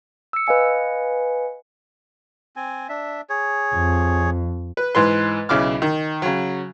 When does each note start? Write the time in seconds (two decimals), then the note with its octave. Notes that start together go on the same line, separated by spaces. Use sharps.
0.33 E6 C#7
0.47 B4 D#5 F5 G#5 C#7
2.56 C4 G#5
2.89 D4 E5
3.30 G#4 C#5
3.74 F2
4.77 B4
4.95 G#2 E3 B4 C6
5.49 B1 C#3 E4 D6 F6
5.82 D#3
6.22 C#3 F#3